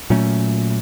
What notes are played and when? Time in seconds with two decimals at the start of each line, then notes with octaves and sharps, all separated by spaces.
0.10 A#2 F#3 A3 C#4